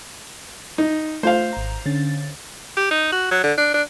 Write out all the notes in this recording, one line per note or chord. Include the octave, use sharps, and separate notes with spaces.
D#4
A3 F4 C5 F5
G#1 A#5
D3 C#4 A6
G4
D#4
F#4
F#3
D3
D4
D4